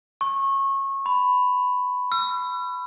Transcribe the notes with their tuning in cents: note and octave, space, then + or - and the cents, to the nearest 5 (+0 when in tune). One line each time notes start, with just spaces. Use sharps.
C#6 -25
B5 +15
E6 +45